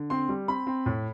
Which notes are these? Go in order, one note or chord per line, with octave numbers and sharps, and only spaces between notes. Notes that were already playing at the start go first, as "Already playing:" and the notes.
Already playing: D3
C4 C6
G3
C4 B5
C4
A2